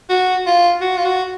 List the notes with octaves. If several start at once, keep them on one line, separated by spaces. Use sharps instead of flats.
F#4
F4
F#4
F4
F#4